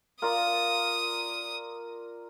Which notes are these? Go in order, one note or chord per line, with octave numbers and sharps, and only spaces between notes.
F4 A#4 D5 D#6